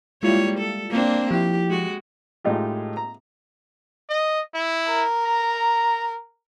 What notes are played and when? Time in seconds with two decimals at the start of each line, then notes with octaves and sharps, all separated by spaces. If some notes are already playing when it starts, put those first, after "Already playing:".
0.23 G3 G#3 A#3 E4 F4 C#5
0.58 A4
0.90 A#3 C4 D4
1.31 F3 E4 G4
1.69 G#3 F#4
2.44 A2 G#3 D#4 F4 G4
2.97 A#5
4.09 D#5
4.54 E4
4.88 A#4
5.26 A#5